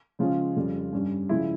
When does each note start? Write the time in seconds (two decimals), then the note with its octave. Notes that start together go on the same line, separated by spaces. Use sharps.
0.19 C#3 F3 G#3 C#4 F4
0.56 F2 C#3 G3
0.93 G2 G3 C#4
1.29 C#3 F3 G#3 E4